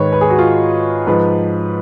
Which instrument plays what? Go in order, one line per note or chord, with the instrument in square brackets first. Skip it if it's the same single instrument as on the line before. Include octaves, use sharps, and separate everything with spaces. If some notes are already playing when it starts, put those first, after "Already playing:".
Already playing: [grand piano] G#2 D#3 B4 C#5
B4
G#4
F#4
F4
G#2 F3 B4